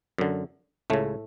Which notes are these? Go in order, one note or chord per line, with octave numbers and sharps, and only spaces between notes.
F#2 D3
C#2 A2 C#3 A3